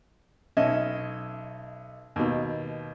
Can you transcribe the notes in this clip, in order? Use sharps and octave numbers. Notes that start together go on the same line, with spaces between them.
B1 C#4 D#5 E5
D#2 B2